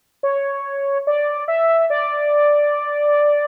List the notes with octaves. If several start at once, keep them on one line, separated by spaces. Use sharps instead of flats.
C#5
D5
E5
D5